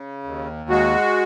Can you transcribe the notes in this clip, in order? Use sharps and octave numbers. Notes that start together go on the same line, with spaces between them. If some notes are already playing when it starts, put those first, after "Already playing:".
Already playing: C#3
D#2
G#3 F#4